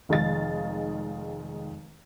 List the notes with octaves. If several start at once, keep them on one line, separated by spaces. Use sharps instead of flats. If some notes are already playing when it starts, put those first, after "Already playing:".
F1 D#3 G#3 D#5 F5 A6